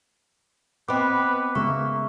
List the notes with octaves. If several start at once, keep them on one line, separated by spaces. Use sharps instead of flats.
B3 C4 B4 D#5 D6
C#3 G#3 A#3 B3 E5 C#6